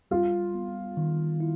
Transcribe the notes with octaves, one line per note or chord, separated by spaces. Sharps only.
G3 F4
B3
D#3
E4